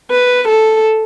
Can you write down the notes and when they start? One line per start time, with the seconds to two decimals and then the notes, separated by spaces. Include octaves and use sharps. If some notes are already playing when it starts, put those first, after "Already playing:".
0.11 B4
0.49 A4